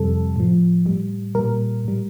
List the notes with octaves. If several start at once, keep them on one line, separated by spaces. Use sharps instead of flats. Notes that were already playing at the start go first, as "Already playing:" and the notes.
Already playing: F2 C3 G3 A4
A2 F3
A2 G3
A#2 G3 A#4
A2 G3